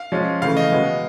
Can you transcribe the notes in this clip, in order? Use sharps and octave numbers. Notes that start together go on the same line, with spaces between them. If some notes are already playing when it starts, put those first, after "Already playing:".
Already playing: F5
F3 G#3 C#4 F4
C#3 E3 A3 F5
D#5
B2 G#3 B3